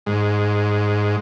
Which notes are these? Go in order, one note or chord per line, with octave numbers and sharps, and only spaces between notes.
G#2